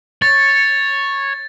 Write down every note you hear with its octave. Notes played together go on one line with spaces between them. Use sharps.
C#5 A6